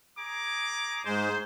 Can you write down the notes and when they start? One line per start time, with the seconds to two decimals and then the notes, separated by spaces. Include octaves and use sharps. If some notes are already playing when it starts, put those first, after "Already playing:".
0.18 G#4 A#5 D6
1.05 G#2 G#4 C5